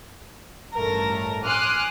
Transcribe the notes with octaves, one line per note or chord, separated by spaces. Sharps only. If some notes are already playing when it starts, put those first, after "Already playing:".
A1 G2 A3 A#4 A#6
G#5 C6 D6 D#6 F6 F#6